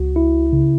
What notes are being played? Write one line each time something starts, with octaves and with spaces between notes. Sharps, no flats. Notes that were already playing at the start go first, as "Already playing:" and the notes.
Already playing: C#2 F#4
E4
C#3